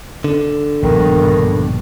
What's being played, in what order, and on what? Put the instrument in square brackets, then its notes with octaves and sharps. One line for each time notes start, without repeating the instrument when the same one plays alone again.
[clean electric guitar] D3
[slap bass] A#1 [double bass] G2 B2 [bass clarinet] D#3